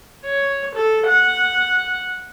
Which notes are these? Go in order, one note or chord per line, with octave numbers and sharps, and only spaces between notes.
C#5
A4
F#5